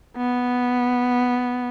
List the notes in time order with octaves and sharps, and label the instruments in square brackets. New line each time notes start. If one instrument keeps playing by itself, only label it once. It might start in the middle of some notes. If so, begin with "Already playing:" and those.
[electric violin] B3